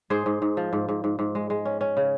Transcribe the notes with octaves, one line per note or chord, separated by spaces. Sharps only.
G#2 G#4 C5
G#2
G#2
F3
G#2
G#2
G#2
G#2
G#3
G#3
C#4
C#4
C#3